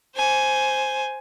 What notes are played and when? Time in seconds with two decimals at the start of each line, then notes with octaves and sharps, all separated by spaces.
0.16 C5 G#5